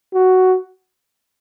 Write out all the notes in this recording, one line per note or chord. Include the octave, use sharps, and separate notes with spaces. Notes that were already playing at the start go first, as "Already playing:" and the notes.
F#4